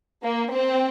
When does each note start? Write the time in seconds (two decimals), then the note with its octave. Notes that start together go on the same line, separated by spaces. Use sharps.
0.23 A#3
0.52 C4